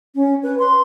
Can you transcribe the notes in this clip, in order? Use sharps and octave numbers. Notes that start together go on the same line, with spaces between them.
C#4
B4
C6